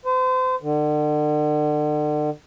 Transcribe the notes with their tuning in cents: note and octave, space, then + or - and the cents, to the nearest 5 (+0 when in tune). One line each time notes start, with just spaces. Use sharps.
C5 -35
D3 +40